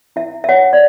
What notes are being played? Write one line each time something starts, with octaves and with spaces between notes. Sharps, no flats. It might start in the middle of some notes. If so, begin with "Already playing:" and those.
E4 E5
E5
C#5 F#5
D5